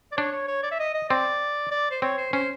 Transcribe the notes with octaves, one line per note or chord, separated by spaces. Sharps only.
D5
D4 C#5
C#5
C#5
D5
E5
D#5
D#5
C4 D5
D5
C5
C4 C#5
C5
C#4 C5